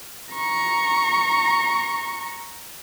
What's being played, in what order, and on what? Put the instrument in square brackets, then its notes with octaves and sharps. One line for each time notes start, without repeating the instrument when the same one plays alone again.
[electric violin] A#5 C#6